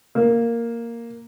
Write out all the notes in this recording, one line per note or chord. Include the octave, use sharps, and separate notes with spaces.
A#3